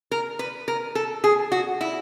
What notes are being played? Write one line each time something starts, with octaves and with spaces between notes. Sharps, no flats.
A#4
B4
A#4
A4
G#4
F#4
E4